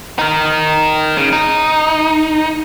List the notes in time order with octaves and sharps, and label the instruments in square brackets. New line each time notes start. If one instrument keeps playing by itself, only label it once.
[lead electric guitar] D#4 A#4
C#3
D#4